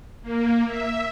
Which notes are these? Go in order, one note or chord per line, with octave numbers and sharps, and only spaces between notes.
A#3
E5